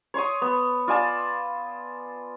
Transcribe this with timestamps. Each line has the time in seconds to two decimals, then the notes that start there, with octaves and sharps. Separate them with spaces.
0.14 C#5 C6 C#6 D#6
0.42 B3
0.88 F4 D5 G#5 A5